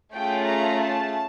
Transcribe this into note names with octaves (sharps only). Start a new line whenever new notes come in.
A3 C#4 F4 G#4 G5
A#5
A5